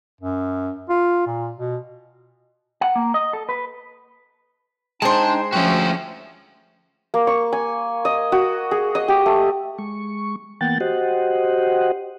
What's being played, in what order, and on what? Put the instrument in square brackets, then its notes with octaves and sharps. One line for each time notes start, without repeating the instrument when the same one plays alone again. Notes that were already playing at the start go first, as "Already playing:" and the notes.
[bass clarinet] F#2
F4
A#2
B2
[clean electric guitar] F#5
A#3
D#5
A4
B4
[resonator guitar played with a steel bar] G#3 C5 [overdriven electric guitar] D4 A5 [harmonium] D#4 G5
[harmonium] D2 G5 [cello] F3 C#4 [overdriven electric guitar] F#4 E5
[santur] A#3
C#6
G#5
D#5
F#4
G#4
D#5
G4
A3
[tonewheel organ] G#3 C#6
E3 A#3 B3 F#5 G5 A6
F#4 G4 C5 D#5 F#5